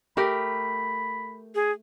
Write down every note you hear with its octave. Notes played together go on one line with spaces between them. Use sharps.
A3 G4 A#4 B5
G#4